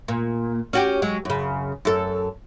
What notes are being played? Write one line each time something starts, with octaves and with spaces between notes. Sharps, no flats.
A#2
C#4 F#4 G4
F#3 G#3
F#2 C#3
F#2 A4